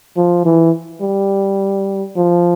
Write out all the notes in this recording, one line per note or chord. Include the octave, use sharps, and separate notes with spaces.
F3
E3
G3
F3